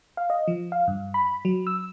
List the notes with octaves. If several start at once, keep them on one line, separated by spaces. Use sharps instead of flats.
F5
D#5
F3
F5
G2
B5
F#3
E6